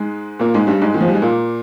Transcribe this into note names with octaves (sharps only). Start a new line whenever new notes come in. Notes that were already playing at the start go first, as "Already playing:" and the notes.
Already playing: G#2 G#3
A#2 A#3
G#2 G#3
G2 G3
G#2 G#3
D#3
F3
G3
G#3
A#2 A#3